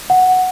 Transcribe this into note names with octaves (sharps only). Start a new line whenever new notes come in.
F#5